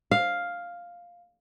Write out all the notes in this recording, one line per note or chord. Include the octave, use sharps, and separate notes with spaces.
F5